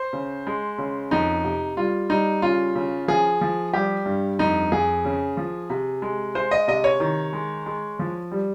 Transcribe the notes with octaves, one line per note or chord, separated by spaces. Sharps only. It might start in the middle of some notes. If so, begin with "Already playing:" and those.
Already playing: C5
C#3
G#3
C#3
F2 D#4
C3
G3 F4
G3 D#4
C#3 F4
C#3
F3 G#4
F3
G3 G4
G2
F2 D#4
F2 G#4
C#3
F3
C3
G#3
G#3 C5
D#5
C3 D#5
C#5
D#3
G#3
G#3
F3
G3